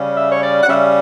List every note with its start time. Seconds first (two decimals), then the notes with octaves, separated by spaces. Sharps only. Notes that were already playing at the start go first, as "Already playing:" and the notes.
Already playing: C#3 G3 C#4
0.14 E5
0.31 C#5
0.41 D5
0.63 F#5
0.67 C#3 G3 C#4 E5